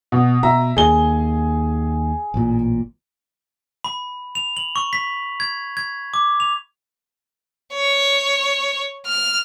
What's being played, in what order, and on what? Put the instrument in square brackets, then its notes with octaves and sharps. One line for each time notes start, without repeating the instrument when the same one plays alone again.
[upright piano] B2
[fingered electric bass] B2 [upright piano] E5 A#5
[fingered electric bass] D#2 [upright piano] G#4 G7
[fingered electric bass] A1 A#2
[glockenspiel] B5
F7
F#7
C#6
B6
G#6
G#6
D6
F7
[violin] C#5
F6